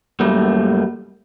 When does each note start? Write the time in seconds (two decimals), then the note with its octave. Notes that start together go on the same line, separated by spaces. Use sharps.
0.20 F#2 G3 A3 A#3